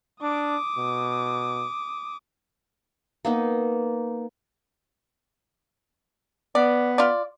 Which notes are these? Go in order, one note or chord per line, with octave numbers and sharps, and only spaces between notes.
D4 D6 D#6
B2
A#3 B3 D#4
B3 D5
F4 D5